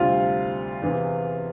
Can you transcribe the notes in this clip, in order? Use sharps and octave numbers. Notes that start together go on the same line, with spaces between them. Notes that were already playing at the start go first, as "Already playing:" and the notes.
Already playing: D2 C3 G3 F4
E2 C3 E3 B3